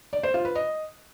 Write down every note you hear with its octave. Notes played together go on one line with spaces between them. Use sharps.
D5
C5
F4
B4
D#5